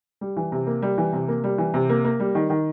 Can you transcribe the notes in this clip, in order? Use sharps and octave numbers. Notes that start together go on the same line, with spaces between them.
G3
E3
C3
A#3
G3
E3
C3
A#3
G3
E3
C3
A#3
A#3
G3
D#3
D#3